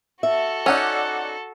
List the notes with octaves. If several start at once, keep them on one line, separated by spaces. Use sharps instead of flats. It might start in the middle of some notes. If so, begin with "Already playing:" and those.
F#4 A4 E5
C#4 D#4 D5 F#5 E6